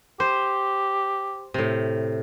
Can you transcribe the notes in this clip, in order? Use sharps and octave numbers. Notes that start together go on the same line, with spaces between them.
G4 C5
A2 C3